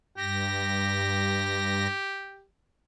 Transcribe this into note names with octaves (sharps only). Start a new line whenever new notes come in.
G2 G4 A#6